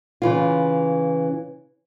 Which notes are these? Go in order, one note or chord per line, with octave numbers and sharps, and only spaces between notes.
C#3 E3 F4